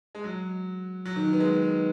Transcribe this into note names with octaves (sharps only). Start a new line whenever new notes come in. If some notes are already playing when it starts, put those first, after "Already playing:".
G#3
F#3
F#3
D#3
B3
G#3
B3